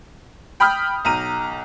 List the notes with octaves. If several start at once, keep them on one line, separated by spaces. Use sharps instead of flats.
G5 B5 D#6 F6 G6
B1 A#5 D#7